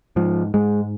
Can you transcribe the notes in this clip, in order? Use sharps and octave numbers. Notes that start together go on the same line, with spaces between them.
G#2 F3
G#2 G#3